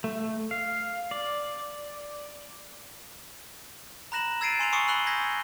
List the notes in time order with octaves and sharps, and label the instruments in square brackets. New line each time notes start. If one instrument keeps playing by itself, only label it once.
[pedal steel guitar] A3
F5
D5
[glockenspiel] A#5 B5 F#6 A#6 E7 F#7
E6 G#6 A6 C7 D7 D#7
G#5 C6 D7 F7
C6 C#6 D#6 C7 C#7
B5 E6 F#6 F#7 G7
G6 G#6 A#6 B6